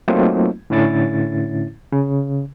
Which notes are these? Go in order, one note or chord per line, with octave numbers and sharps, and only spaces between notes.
F#3 A3 A#3 C4 D#4 F4
A2 D3 C#4 E4 A6
C#3